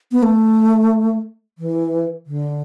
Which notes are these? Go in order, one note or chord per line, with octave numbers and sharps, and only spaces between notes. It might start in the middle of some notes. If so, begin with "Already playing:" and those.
B3
A3
E3
D3